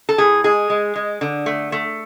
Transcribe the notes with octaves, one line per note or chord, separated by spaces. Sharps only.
A4
A2 G#4
G#3 G#4
G#3
G#3
D3
A3
A3